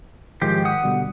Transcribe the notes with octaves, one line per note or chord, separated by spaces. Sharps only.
G#2 D#3 F3 G#3 G4
F#5 D#6
B2 D3 G3